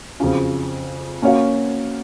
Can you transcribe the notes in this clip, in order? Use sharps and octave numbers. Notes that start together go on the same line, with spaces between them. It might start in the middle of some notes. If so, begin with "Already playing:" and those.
F2 C#3 F#3 C#4 F4
A#3 C#4 F#4 C#5 F5